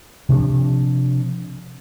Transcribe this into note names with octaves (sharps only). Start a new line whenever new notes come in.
C3 F3 D4